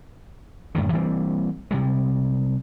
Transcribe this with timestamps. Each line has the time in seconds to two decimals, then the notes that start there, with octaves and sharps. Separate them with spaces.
0.75 F#2 A2 D3 D#3
0.93 E3 G3 A#3 C4
1.71 C3 G3 G#3